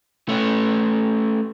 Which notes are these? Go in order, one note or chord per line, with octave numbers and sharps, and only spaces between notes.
A3 C#4